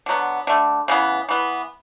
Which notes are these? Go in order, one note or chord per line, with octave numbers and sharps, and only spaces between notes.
D3 F#3 B3
D3 A3
C#3 E3 B3
E3 B3